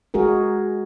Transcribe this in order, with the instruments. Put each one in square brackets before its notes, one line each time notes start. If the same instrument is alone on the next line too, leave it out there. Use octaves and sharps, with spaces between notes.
[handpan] G#3 F#4 G#4 A#4